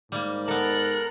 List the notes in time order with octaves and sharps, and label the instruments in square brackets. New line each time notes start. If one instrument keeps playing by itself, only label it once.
[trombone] G#2 [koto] G3 A#3
[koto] B3 A4 [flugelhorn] A#4 [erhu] F#6